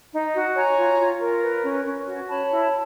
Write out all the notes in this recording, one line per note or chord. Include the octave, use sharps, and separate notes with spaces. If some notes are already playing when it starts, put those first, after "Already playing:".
D#4
F#4
C#5 G#5 A#5
F4
F4
A#4
B4
C#4
C#4
F#4
C#5 A5 B5
E4